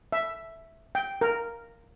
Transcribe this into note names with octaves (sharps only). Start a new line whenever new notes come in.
E5
G5
A#4